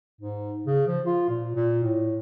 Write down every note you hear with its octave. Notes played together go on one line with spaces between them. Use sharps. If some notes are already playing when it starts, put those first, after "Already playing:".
G#2
C#3
F3
F4
A#2
A#2
A2